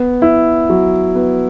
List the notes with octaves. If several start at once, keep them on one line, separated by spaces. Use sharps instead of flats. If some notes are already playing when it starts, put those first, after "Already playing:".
Already playing: B3
E4
F#3
B3